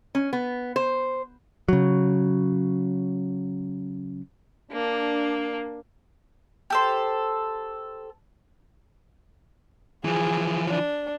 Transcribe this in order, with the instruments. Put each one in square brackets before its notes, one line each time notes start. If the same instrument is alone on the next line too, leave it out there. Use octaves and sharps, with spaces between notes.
[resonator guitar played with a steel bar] C#4
B3
C5
[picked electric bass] C#3 F#3
[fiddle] A#3 [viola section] D4
[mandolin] G4 A4 C5
[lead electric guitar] E3 F3 [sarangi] G#4
[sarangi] D4